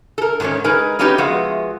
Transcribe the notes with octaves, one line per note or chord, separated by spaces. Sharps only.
A4 A#4
G#2 D#3 G3 G#3 C#4
G#3 D#4 A#4 B4 G#5
F#3 B3 C#4 D#4 G4 B4
F3 G#3 B3 F#4 E5